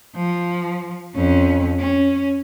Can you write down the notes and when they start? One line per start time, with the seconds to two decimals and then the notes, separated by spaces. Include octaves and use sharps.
0.16 F3
1.15 F2 C#4
1.79 C#4